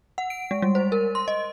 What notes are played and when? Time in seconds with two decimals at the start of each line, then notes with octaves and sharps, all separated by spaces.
0.18 F#5
0.30 D7
0.51 G#3
0.62 G3
0.75 C5
0.92 A#4
1.15 C6
1.28 D#5